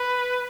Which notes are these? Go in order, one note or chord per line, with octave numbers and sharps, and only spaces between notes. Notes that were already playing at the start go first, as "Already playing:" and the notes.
Already playing: B4